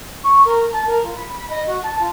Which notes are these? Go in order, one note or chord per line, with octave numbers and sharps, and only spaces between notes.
C#6
A#4
A5
A#4
F4
B5
B5
D#5
F#4
A5
F4